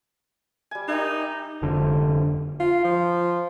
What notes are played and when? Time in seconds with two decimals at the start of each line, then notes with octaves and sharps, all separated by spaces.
0.71 G3 G#5
0.88 D#4 G4 A#4 E5
1.62 F1 D3
2.60 F4
2.84 F3